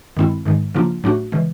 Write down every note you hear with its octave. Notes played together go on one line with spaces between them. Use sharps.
G2 D#3 G#3 C4 E4
G#2 D#3 G#3
C#3 F3 A#3 D4 F4
A2 F#3 A3 D4 F#4
C#3 E3 G#3